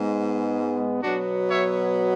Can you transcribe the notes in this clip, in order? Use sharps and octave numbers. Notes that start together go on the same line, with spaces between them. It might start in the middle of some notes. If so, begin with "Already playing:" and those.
Already playing: G#2 G#3 B3
B2 F#3 B3 D4 F#4
C#5 E5